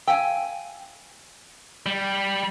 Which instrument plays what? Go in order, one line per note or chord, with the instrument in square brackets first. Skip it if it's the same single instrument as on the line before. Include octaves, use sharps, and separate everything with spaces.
[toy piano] F5 E6 [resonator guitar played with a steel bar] G5 G#5
[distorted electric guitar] G3